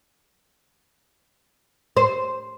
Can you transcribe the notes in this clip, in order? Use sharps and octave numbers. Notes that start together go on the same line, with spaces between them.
C5